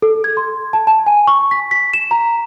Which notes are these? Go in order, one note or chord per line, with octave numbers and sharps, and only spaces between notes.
A4
G#6
C6
A5
A5
G#5
C#6
B6
B6
E7
A#5